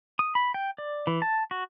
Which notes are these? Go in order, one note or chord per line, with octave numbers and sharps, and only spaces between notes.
D#6
B5
G5
D5
E3
A5
F#4